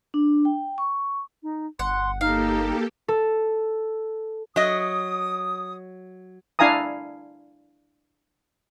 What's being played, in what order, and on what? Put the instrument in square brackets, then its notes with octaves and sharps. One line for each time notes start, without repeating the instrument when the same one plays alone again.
[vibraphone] D4
G5
C#6
[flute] D#4
[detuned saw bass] G1 [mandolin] F#5 [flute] C6
[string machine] A#3 G4 A4 [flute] D#4 [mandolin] F5
[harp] A4
[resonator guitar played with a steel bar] F#3 D#5 [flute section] D#6
[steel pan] D4 E4 F5 G#5 A#5 D#6